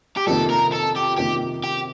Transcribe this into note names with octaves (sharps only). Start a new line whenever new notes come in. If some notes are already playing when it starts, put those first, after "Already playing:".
G4
F2 C3 D#3 A#3 A4
A#4
A4
G4
F2 C3 D#3 A#3 G4
G4